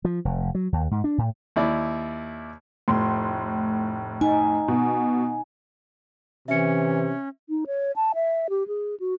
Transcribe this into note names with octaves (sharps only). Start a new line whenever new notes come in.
F3
F1
F#3
D#2
G#2
D4
A2
D#2 E4 D5
F1 A2 C6
D#4 G#5
B2
C3 E3 C#4 E5 C#7
D#4
C#5
A5
E5
G4
G#4
F#4